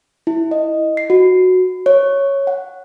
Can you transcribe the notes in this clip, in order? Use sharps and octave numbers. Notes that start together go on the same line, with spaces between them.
E4
D#5
C7
F#4
C#5
F#5